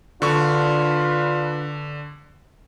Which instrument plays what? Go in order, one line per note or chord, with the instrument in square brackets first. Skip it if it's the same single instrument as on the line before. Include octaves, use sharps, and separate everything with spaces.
[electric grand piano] D3 C#6 [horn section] D4 F4 B4